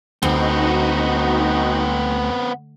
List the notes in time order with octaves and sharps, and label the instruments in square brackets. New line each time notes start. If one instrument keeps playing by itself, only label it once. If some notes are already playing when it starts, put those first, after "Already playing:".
[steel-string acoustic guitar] D2 [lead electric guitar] B3 C4 [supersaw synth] D#4 F#4